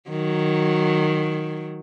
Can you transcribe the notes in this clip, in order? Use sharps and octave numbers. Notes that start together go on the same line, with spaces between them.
D#3 F#3